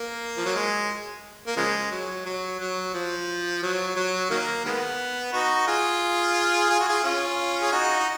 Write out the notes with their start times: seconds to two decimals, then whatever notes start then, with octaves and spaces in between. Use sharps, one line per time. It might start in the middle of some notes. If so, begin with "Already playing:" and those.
Already playing: A#3
0.37 F3
0.45 F#3
0.55 G#3
1.47 A#3
1.57 C#3 F3 G#3
1.91 F#3
2.26 F#3
2.60 F#3
2.94 F3
3.62 F#3
3.96 F#3
4.30 D#3 F#3 A#3
4.65 D#3 G#3 B3
5.33 D#4 F#4
5.67 F4 G#4
6.70 G#4
6.80 F#4
6.89 F4 G#4
7.03 C#4 F4
7.61 G#4
7.72 D#4 F#4
7.99 D#4